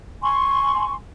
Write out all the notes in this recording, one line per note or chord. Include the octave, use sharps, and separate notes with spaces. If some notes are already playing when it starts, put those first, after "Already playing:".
G#5 C6 C#6